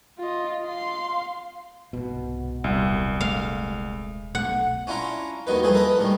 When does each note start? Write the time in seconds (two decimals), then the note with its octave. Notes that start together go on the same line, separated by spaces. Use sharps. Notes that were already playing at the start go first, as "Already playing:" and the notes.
0.19 F4 D#5
0.66 F5 C6
1.93 C2 G#2 B2
2.64 D#1 C2 F#3
3.21 G#3 A3 F5
4.35 B1 A3 F#5
4.87 C#4 D4 E4 F4 A#5
5.47 D#2 D#3 F#3 D#4 B4
5.63 E3 F3 G3 G#4 A4
5.74 A#4 B4 D#5 A5 B5
5.99 A2 D#3 G3